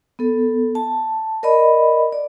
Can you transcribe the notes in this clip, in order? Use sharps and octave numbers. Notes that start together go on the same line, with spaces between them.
B3 A4
A5
A#4 D5 D#5 B5
D5